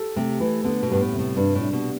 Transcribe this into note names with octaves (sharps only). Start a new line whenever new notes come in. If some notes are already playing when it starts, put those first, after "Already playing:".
Already playing: G4 A4
C3 A3
E3 A3
D3 B3
B2
G2 G3
A2
C3
A2
G2 D4
A2
D4
B2